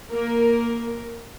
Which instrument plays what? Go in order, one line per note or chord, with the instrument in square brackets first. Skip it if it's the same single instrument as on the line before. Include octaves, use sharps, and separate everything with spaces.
[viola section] A#3 A#4